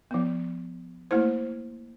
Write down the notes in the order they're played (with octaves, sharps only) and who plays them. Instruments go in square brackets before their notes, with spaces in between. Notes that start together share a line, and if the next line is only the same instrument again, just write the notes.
[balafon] F3 B3
A3 A#3 E4 C5